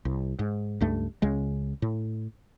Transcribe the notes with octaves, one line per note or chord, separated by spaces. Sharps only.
C2
G#2
C#2 G2 A3
C#2 C#3 G#3
A2